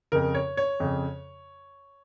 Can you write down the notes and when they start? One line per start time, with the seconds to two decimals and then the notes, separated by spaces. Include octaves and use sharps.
0.12 F2 C#3 A#4
0.35 C#5
0.57 C#5
0.80 F2 C#3